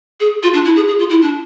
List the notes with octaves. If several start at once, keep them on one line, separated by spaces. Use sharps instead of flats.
G#4
F4
D4
E4
G#4
G#4
F4
E4
D4